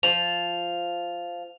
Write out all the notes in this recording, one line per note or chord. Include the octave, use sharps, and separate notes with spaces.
F3 F7